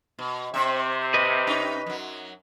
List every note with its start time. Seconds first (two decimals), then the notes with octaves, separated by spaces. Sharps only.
0.19 B2
0.54 C3 C4 E5
1.14 B4 D#5
1.47 C#4 D#4
1.86 F#2 F#3